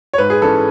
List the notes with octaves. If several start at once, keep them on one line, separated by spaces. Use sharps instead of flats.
C#5
G#2 B4
G#4
E3 G#3 C#4 A4